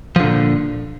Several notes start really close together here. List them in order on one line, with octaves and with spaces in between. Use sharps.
F3 D3 A#2